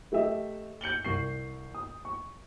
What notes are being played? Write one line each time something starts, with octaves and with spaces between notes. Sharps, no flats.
A3 G4 A4 D#5 E5
G6 C#7 F#7 G7
C2 C#6 C7
D#6
C#6